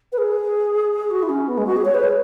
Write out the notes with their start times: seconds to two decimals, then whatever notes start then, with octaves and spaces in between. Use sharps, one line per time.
0.12 B4
0.18 G#4
1.10 F#4
1.22 E4
1.29 C#4
1.48 B3
1.57 G#3
1.66 F#4
1.76 G#4
1.85 C#5
1.94 B4
2.04 G#4